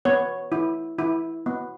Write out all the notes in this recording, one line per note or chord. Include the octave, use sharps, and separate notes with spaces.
B3 C#5
E4
E4
B3